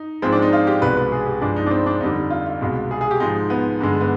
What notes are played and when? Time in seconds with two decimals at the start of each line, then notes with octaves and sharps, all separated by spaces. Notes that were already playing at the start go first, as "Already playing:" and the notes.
Already playing: D#4
0.22 G#2 F3 G#3 C4
0.32 D4
0.42 D#4
0.53 F4
0.67 G4
0.82 C2 B2 G#3 B4
0.97 B4
1.12 G#4
1.26 G4
1.41 G2 F3 G#3 D4
1.56 D#4
1.66 D4
1.71 C4
1.86 D4
2.01 F2 D3 G3 D#4
2.30 F4
2.46 F4
2.61 C2 B2 G#3
2.91 G#4
3.01 G#4
3.11 G4
3.20 G#2 F3 G#3 D#4
3.50 B3
3.81 G2 D3 G#3
4.01 B3